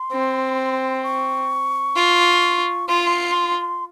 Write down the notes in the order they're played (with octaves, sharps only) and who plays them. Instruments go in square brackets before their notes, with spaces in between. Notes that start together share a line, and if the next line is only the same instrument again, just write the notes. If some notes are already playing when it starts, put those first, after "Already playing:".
Already playing: [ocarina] C6
[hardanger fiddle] C4
[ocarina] C#6
[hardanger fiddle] F4
[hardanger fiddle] F4 [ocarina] C6